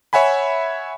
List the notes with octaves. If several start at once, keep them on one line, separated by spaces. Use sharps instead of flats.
C#5 E5 F#5 G#5 B5